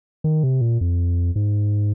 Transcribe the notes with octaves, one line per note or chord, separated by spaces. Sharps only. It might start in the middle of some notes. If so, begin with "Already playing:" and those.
D#3
C3
A#2
F2
G#2